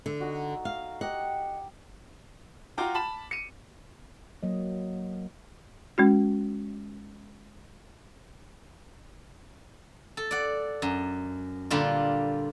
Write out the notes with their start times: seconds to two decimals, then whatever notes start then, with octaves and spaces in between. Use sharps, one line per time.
0.06 D3
0.20 D#4 F#4
0.65 F5
1.01 G4 D#5 F#5
2.78 F4 F#4 G5 A#5 D6
2.94 A5 B5 E7
3.31 C#7 D#7
4.43 F#3 A#3 D#5
5.98 G#3 C#4 F#4
10.17 A4
10.31 D5 F#5
10.82 F#2
11.70 A#2 D3 G3 D4 F4